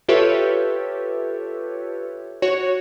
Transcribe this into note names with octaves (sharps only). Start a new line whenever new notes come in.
F4 G4 A4 B4 C#5 E5
F#4 C#5